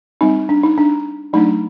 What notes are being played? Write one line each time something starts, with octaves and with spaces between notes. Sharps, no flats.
G3 C4 D#4
D4
D#4
D4
F#3 A3 D4 D#4